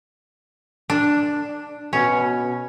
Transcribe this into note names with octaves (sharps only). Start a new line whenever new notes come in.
D4
B2 C#4